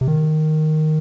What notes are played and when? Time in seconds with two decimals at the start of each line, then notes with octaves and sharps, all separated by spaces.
0.01 C3
0.08 D#3